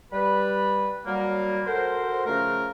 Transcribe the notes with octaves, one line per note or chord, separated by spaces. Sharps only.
G3 B4
F#3 G3 A#3
F#4 A4 A#4 C5
C#3 F3 A3 A#4